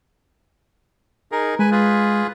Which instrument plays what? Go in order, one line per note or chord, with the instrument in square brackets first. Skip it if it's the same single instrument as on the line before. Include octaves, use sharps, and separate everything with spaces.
[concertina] D#4 G#4 A#4
[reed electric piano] G#3 [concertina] B4 G#5
[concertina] F4 G#4 B4